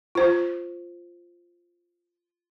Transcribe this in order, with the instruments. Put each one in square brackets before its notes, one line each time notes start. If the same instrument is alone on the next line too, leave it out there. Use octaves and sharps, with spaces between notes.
[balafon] F4 C5